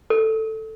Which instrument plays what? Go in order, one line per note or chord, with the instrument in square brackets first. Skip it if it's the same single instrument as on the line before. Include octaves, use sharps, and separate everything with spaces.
[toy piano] A4